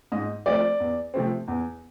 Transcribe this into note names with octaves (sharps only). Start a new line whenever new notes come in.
G#2 D#5
F3 A3 C4 D5
E2
C3 F3 A3 C4
E2